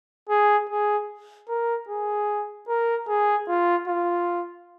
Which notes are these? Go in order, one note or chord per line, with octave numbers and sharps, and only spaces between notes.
G#4
G#4
A#4
G#4
A#4
G#4
F4
F4